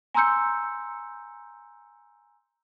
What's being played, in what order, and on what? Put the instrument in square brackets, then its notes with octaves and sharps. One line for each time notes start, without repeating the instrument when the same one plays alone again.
[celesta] G#5 A#5 C6 E6 G6 C#7